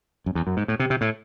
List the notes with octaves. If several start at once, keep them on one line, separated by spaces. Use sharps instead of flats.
F#2
E2
F#2
G#2
A2
C3
C3
A2